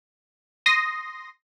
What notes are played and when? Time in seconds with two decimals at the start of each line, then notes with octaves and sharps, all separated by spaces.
0.66 C6 D#6 A#6 C7